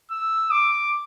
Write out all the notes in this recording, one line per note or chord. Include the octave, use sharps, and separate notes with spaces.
E6
D6